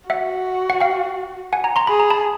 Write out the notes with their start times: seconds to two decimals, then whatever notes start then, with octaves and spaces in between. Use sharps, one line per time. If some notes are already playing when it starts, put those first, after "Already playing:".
0.10 F#4 E5 F#5
0.70 F#5
0.80 F5 G5
1.53 F#5 G#5
1.64 G#5 A#5
1.76 A#5 C6
1.87 G#4 B5
2.00 A#5
2.10 A5 B5